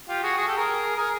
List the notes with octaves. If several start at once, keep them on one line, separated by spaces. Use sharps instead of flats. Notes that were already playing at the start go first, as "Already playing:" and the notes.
F4 G4
F#4 G#4
F#4 G#4
G4 A4
G#4 A#4
G#4 A#4